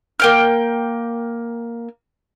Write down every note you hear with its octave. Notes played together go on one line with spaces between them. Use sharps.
A#3 G5 F6